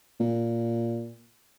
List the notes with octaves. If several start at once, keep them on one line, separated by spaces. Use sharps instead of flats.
A#2